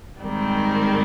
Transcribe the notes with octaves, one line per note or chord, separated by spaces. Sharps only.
G#2 D#3 G3 C4